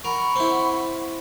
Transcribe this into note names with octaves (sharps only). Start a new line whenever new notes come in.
A#4 F#5 B5 C#6
C4 E4